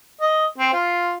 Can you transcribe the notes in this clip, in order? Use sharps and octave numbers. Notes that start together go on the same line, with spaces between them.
D#5
C4
F4